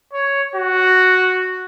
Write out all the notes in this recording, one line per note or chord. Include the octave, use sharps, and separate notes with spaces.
C#5
F#4